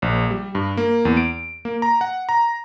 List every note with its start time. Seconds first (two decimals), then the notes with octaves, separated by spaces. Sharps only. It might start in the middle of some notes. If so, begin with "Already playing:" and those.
0.02 A#1
0.31 G3
0.55 G2
0.77 A#3
1.05 E2
1.17 D7
1.65 A#3
1.82 A#5
2.01 F#5
2.29 A#5